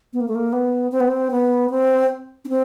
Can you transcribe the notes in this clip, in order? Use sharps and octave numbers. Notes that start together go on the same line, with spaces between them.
B3
A#3
A3
A#3
B3
C4
B3
C4
B3
C4
C#4
C4